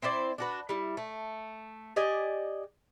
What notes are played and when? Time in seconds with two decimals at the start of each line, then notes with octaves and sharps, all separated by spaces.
0.02 C4 E4 C5 D5
0.38 D4 F#4 B4
0.69 G3 E4
0.97 A3
1.96 G4 D5 D#5 G#5